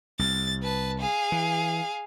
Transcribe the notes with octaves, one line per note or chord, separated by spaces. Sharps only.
C2 A6
B4 A5
G#4 F5
E3